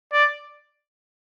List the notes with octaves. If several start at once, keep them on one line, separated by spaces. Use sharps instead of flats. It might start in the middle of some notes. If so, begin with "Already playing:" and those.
D5